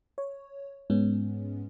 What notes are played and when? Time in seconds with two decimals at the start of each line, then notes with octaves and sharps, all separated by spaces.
0.18 C#5
0.90 G#2 G#3 B3 C#4